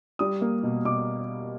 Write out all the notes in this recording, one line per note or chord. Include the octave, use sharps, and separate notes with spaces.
G3 D#6
A#3
B2
B2 D6